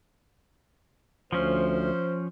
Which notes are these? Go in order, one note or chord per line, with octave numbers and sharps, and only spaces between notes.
D2 F3 C#4 C5